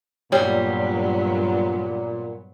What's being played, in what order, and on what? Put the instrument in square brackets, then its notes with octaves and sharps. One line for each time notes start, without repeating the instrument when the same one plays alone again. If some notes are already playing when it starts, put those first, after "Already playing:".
[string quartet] G2 F#3 B3 [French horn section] A#2 [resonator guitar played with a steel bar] G3 [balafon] C#5